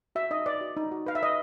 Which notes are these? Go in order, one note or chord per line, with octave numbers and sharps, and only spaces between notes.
F#4 E5
D#4 D#5
B4 D5
F#4
D#4
F#4
B4 F5
E5
B4 D#5